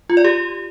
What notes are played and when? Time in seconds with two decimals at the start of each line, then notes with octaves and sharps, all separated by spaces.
0.10 F4
0.17 D5
0.24 G4